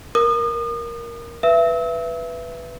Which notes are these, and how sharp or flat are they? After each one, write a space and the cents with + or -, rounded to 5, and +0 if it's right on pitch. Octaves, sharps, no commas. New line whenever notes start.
A#4 +5 D#6 -40
B4 +0 E5 +25 E6 -40